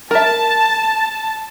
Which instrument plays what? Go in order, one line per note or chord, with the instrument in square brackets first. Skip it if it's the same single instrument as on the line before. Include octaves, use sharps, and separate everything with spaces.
[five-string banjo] A#4 E5 [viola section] A5